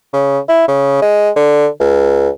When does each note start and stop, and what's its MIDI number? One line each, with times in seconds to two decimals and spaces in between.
0.13 0.39 49
0.49 0.66 64
0.68 1.01 49
1.02 1.30 56
1.36 1.67 50
1.80 2.29 37